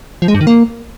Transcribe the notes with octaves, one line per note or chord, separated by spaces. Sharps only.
F3
G#3
G2
D#3
A#3